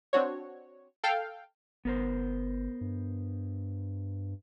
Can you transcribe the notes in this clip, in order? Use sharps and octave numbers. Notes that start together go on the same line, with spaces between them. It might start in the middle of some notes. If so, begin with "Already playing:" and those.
C4 D4 F#4 C#5
A4 F5 G5
G1 B3 A#4 C5
G2